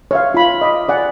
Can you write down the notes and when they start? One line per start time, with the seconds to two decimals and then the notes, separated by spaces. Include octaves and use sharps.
0.11 C#5 E5 F5
0.34 F4 B5
0.61 D#5 B5 D6
0.89 D5 F#5 G#5